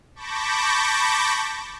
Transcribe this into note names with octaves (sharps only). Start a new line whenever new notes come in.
A5 B5 C#6 D6 G6 A#6